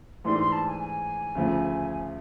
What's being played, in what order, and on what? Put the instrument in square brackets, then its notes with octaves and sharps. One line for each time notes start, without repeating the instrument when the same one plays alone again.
[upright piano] G#2 E3 A3 D4 G4 [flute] C6
[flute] C6
A5
G#5
G#5
[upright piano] D2 C#3 F3 A3